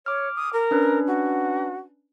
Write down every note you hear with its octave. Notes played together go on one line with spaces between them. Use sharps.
C#5 D6 F6
D#6
A#4
C#4 D4 B4
F#4